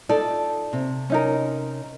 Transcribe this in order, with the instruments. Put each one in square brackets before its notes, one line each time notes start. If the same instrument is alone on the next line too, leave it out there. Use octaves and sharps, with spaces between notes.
[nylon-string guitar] D#4 F4 D5 [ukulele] A4
[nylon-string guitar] C3
[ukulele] C#4 D#4 A#4